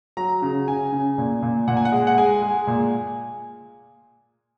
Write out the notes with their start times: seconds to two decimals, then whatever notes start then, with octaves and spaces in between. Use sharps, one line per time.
0.17 F#3 A#5
0.42 C#3
0.68 C#3 G#5
0.92 C#3
1.18 A#2
1.42 A#2
1.68 A#2 F#5
1.77 G#5
1.85 F#5
1.92 G#3
2.07 F#5
2.18 G#3 G#5
2.42 G#3
2.67 A#2